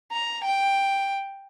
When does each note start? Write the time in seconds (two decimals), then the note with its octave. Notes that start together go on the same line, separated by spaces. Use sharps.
0.12 A#5
0.44 G5